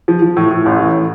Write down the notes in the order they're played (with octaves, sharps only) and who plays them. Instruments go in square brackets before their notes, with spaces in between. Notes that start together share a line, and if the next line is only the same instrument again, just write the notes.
[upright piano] F3
F3
A2
A2
A1
A2